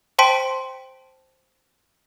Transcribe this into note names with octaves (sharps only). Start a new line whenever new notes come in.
C5 G5 A5 C6 B6 D7